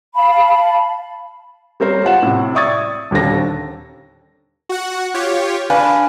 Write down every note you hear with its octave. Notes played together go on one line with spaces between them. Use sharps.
F5 A5 B5
G3 C4 A#4 C5 C#5
G3 F4 F#5 E7
A2 C3
D5 E5 C#6 D#6 G#6 A6
D#1 D#2 D3 C4 A4 A#6
F#4 F#5
F4 G4 C#5
D4 B4 F5 G#5